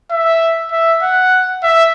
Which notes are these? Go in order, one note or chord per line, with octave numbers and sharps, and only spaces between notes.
E5
E5
F#5
E5